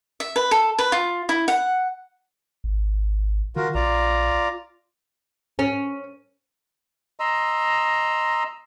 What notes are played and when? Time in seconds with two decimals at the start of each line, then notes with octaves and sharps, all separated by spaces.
0.20 E5
0.36 B4
0.51 A4
0.79 B4
0.92 F4
1.29 E4
1.48 F#5
2.64 G#1
3.56 D#3 F4 F#4 A#4
3.75 A#1 F4 D5 A#5
5.59 C#4
7.20 D#5 A#5 C6 E6